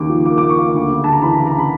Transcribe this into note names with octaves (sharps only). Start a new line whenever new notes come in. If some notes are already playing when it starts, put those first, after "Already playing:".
Already playing: D#2 C#3 D6
F3
A#3 D6
D6
A#3
C#6
A#3
D2
C#3
D2 A5
A#5
E3 B5
A#5
C#3
A#5
C#3 B5